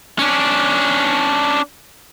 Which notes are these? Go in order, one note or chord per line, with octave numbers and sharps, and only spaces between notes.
C#4 D4